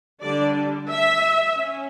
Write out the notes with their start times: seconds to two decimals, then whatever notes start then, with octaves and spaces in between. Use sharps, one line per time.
0.22 D3 G3 D4 D5
0.89 E5
1.57 C#4